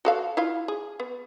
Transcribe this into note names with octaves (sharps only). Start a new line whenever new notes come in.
F#4 A4 F5
E4 F4 F5
G#4
B3